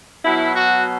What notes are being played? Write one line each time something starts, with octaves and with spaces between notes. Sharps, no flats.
B2 F#3 E4
F#4